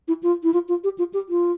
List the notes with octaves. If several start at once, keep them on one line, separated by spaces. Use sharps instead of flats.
E4
F4
E4
F4
F4
G4
F4
G4
F4